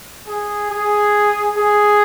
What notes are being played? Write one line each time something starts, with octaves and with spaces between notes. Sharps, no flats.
G#4
G#4
G#4